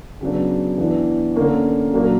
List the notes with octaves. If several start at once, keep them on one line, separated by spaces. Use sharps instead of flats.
C#3 F#3 B3 D4
E3 B3 D4
D3 A#3 C#4
A#2 F#3 A#3 D4